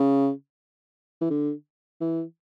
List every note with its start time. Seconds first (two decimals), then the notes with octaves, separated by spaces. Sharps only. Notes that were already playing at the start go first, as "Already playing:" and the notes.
Already playing: C#3
1.21 E3
1.30 D3
2.01 E3